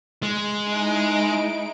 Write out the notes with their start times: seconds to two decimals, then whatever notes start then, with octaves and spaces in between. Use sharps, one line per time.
0.23 G#3
0.65 D#4 E4 D7